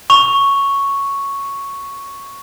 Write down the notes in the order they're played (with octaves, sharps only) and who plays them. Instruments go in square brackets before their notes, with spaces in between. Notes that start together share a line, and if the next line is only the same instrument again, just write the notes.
[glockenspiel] C#6 F7